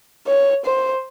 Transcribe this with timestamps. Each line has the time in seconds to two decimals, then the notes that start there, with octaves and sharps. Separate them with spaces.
0.27 C#5
0.65 C5